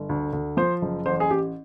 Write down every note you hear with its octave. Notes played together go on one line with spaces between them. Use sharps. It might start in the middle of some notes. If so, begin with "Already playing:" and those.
Already playing: G1
D2
D2
F3 C5
F#1
A1 C5
G#4
A1 G4